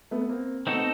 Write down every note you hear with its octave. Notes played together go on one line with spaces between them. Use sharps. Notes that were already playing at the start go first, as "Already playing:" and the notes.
A3 B3
B3
A#3 C4
A3 B3 C4 D#4 F#4 A4
B3